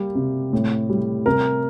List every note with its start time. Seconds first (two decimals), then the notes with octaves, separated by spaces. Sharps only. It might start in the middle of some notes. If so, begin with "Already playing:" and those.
Already playing: G3 A#3
0.15 C3
0.53 A2
0.89 G3
1.26 C3 A#4